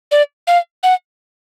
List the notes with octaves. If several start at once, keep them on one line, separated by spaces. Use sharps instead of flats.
D5
F5
F#5